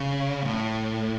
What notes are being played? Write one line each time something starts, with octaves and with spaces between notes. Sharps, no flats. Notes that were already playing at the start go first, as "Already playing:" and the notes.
Already playing: C#3
A2